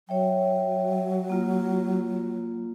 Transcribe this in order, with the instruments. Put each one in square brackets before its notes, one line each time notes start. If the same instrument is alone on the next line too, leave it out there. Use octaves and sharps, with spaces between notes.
[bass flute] F#3 [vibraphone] C#5 E5 G5
[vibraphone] A#3 F4